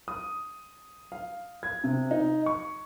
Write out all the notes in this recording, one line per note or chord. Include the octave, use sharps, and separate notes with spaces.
D#6
F5
G#6
C3
D#4
C#6